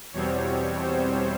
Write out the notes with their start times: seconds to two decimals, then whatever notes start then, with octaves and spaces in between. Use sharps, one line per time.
0.13 E2 B2 G3 C4 C#5
0.81 C5